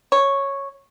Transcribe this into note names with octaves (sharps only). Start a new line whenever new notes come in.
C#5